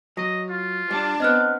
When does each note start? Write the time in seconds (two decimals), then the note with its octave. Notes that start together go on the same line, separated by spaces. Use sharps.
0.17 F#3 D#5
0.49 F4
0.91 G3 D4
1.20 B3 C4 D#5 F6 F#6